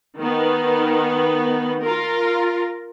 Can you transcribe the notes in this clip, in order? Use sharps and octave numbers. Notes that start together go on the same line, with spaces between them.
D#3 B3
F4 A#4